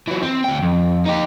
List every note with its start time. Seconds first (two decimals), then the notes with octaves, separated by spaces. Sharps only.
0.08 E3 F#3
0.23 C4
0.44 D2 G5
0.63 F2
1.05 D#4 G4